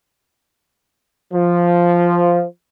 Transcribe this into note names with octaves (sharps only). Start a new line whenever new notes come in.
F3